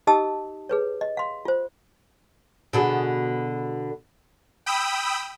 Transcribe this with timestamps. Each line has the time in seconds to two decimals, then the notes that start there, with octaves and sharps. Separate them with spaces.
0.07 D#4 G4 D#5 A5 D#6 E6
0.69 G#4 B4 C#5
1.01 D#5
1.17 F5 C6
1.45 F4 C5
2.73 B2 D3 G#4
4.66 G5 B5 D#6 E6